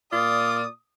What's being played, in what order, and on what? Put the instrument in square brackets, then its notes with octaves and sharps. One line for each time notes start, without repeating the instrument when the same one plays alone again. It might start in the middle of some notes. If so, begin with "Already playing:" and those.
[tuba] A#2 [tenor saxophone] F4 [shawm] D5 [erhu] D#6